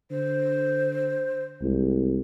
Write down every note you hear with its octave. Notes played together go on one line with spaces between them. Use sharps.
D3 C5
C2 G#3